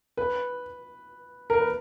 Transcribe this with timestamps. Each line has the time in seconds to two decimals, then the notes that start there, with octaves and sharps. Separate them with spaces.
0.17 B4
1.50 A#4
1.57 B4